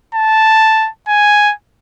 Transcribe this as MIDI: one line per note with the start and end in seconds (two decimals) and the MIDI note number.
0.15 0.89 81
1.08 1.53 80